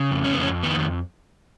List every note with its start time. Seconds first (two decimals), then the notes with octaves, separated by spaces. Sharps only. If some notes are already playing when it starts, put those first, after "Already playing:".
Already playing: C#3
0.11 F2
0.24 C#4
0.33 B3
0.37 F2 C#4
0.63 D#3 B3